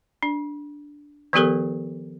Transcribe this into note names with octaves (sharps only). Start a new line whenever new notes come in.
D4
D#3 F3 B3 G4 A4 A#4